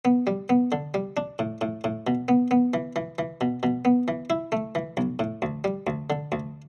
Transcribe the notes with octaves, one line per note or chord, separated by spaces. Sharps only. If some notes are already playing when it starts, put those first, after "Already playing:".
B3
G3
B3
D3
G3
D4
A2
A2
A2
B2
B3
B3
E3
E3
E3
B2
B2
B3
E3
E4
A3
E3
B1
A2
D2
G3
D2
D3
D2